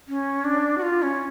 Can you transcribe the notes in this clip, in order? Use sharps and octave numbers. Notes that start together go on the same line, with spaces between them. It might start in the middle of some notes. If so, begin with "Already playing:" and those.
C#4
D4
F#4
F4
C#4